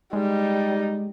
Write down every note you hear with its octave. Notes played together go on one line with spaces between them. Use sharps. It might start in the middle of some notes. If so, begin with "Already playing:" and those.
G3 G#3 D#4